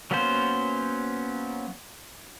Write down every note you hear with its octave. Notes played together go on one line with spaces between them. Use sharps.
F#3 A#3 B3 C#4 C5